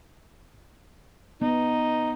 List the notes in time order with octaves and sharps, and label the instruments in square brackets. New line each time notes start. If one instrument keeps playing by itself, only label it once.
[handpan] B3 [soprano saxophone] D#4